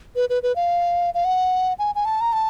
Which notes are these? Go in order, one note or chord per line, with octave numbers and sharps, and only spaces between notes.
B4
B4
B4
F5
F5
F#5
G#5
G#5
A5
A#5
A5